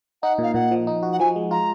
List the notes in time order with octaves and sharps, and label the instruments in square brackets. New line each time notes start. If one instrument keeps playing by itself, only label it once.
[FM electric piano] D#4 [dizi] F#5
[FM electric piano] A#2 [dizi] F5
[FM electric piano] A#2 [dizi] F#5
[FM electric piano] F3
D#4
F#4
[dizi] F#5
[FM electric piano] F3 [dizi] G#5
[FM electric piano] G#3
[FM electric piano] F4 [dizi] A#5